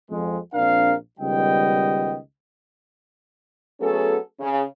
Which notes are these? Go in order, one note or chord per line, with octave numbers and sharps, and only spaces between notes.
F2 G#3
A#1 C4 D4 A#4 F5
C#2 D#3 G3 B3 D#5 G5
F#3 A3 B3 C#4 G#4 A4
C#3